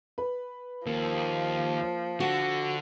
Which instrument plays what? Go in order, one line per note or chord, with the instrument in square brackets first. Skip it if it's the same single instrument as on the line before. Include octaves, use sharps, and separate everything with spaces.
[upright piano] B4
[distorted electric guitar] D#2 [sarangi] F3 [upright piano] A#3
[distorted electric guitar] D3 [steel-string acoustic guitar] F#4